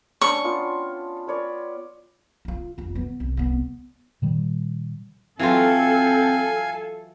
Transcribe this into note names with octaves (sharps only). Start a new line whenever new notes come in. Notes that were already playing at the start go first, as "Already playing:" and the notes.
C#4 D4 C#6
B3 F4 G5
B4 C#5 D5
D#4 F4
F1 F4
E3 B3
C2
C2 B3
A#2 D#3 G3
E3 F#3 C4 F4 A4 F5 G#5